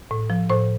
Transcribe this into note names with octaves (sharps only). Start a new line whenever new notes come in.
A2
F3
A2 C5